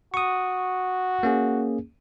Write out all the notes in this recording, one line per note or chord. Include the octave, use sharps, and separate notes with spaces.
F#4 C#6 D#6
A#3 C#4 G#4